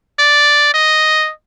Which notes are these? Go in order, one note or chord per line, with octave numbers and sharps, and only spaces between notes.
D5
D#5